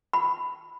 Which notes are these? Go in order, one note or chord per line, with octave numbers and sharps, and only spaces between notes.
B5